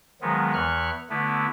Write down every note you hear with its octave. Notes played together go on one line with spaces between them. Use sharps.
D#3 F3 F#3 G#3 B3
E2 E3 C#6 F6 F#6
D3 A3 B3 E4